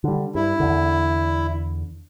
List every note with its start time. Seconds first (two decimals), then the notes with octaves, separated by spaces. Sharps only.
0.04 D3 G3
0.35 G2 E4
0.60 E2 D3